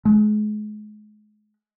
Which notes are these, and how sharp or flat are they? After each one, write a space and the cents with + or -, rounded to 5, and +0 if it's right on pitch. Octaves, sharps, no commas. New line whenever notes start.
G#3 +35